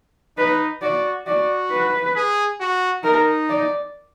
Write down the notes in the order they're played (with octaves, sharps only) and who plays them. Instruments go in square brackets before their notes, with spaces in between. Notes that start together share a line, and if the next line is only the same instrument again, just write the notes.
[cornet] D#4 [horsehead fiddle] B4
[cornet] F#4 [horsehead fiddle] D5
[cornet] F#4 [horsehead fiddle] D5
[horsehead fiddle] B4
[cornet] G#4
F#4
[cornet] D#4 [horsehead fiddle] A#4
[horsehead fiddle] D5